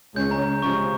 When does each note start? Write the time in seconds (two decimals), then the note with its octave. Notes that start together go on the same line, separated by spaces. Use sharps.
0.16 C#2 C#3 G#3 C#4 G6
0.31 A#5
0.62 C3 F3 G#3 C#4 C#6